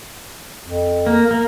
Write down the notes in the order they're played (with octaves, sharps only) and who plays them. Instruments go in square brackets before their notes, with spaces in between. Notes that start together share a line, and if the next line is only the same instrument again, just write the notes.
[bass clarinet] F2
[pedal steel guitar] A#3
A#3